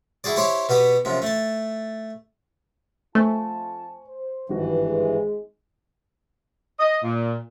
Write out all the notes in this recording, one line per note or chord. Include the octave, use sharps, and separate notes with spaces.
E4 F#4 G#4 D5
E4 G4 C5 C#5 C#6 D6
B2 B3 F#4 G4
F#2 C3 F3
A3 A5
F2 A3 F4 C5 G#5 A5 C#6
C5
G#1 G2 E3 F3 F#4
G#3
D#5
A#2